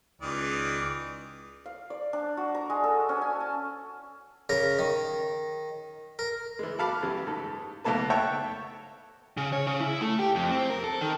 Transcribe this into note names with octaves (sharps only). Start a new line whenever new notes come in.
C#2 D#3 E3 D5
F5
D5
D4
F#4
A#5
G#3
A4
C#4
G#5
A5
C#3 A#4 A#5
D#3
A#4
E3 G#3
F#4 A4 F5 A5 B5 D6
F#2 E3 G3
G#2 A4
B1 B2 A3 A#3 A4 B4
A4 C#5 E5 F#5 G5 C#6
C#3
C#5
C#3
E4
A3
G4
F2
C4
A#4
A4
D#3